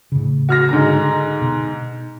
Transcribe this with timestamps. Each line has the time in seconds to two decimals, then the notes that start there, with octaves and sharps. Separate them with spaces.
0.12 A2 C#3
0.49 F#4 F6 A#6
0.69 G#2 D3 A#5
1.41 B2